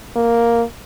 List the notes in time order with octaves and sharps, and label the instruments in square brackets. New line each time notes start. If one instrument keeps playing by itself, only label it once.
[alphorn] A#3